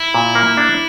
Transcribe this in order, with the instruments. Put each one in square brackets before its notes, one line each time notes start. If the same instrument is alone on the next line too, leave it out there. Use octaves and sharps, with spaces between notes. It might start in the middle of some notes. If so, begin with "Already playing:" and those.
Already playing: [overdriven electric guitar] E4
[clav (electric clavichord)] A#2
A#3
D4